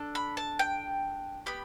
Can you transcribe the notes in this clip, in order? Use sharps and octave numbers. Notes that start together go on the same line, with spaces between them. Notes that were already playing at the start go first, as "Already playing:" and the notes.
Already playing: D4 A4
B5
A5
G5
B3 G4 B5